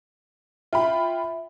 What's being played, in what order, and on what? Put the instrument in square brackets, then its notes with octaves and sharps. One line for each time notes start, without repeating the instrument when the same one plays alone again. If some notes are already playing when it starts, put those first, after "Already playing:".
[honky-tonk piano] F4 G5 B5 [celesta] E5